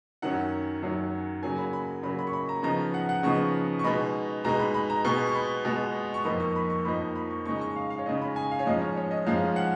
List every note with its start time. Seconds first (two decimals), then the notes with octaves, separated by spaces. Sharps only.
0.22 F#2 D#3 F#3 C#4 F#5
0.82 F#2 D#3 F#3 C#4
1.42 C#3 F#3 A#3 G#5
1.58 B5
1.73 B5
2.03 C#3 F#3 A#3 B5
2.19 B5
2.27 C#6
2.33 B5
2.49 A#5
2.63 C#3 F3 B3 D#4 A#5
2.94 F#5
3.09 F#5
3.23 C#3 F3 B3 D#4 C#6
3.79 C#6
3.84 B2 G#3 D#4 B5
4.44 B2 G#3 D#4 A#5
4.60 B5
4.74 B5
4.90 A#5
5.05 B2 G#3 B3 C#6
5.27 C#6
5.35 B5
5.65 B2 G#3 B3
6.14 C#6
6.25 F2 F3 A#3 D#4 B5
6.40 C#6
6.56 B5
6.70 C#6
6.85 F2 F3 A#3 D#4 B5
7.15 B5
7.31 C#6
7.46 C#3 G#3 D#4 C#6
7.61 C#6
7.76 F5
7.90 F5
7.98 C#5
8.06 C#3 G#3 D#4 D#5
8.22 B5
8.36 G#5
8.51 F5
8.59 C#5
8.66 G#2 F3 G#3 C#4 D#5
8.81 C#5
8.97 C#5
9.11 D#5
9.26 G#2 F3 G#3 C#4 F5
9.56 F#5